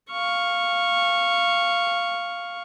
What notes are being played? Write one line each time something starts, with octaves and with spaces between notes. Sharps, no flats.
F5 C#6